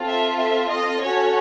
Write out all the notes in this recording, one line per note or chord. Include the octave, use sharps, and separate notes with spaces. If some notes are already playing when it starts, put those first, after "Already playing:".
Already playing: C4 F4 A4
E5
E5
D#5
C#4 F#4 A4 C#5